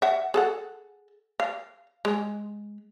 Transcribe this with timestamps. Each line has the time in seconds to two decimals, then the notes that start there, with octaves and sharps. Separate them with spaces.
0.02 E5 F#5
0.34 G#4 A4 F#5
1.40 F5
2.05 G#3